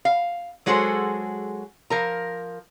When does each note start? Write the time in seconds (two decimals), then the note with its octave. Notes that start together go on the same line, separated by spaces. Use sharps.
0.05 F5
0.66 F#3 G#3 F#4 G#4 A4 C5
1.90 F3 A#4 A#5